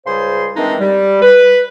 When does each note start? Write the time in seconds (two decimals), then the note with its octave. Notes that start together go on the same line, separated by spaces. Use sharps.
0.06 C#2 C#3 G3 G#4 C5 C6
0.56 D#3 E3 G#3 C4 D4 D#4
0.80 G3
1.22 B4